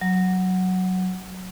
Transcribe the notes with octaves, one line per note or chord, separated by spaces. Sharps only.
F#3